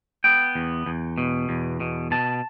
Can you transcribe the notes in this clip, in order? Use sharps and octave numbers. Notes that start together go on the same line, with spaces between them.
B3 G5
E2
E2
B2
E2
B2
B2 A5